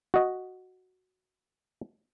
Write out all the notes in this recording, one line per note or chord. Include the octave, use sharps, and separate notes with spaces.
F#4 D#5